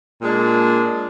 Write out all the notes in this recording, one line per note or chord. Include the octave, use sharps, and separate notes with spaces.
A#2 G#3 D4